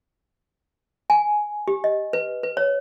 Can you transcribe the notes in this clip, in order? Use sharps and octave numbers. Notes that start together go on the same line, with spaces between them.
G#5
G4
D#5
B4
B4
C#5